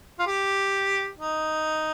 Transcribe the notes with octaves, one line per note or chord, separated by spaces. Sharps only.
F4
G4
D#4